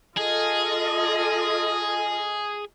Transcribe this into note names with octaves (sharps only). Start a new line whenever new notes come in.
F4 G#4 A4 D#5